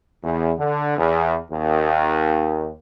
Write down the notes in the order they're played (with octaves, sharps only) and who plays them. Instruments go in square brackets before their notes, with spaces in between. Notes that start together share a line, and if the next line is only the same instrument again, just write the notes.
[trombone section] E2
D3
E2
D#2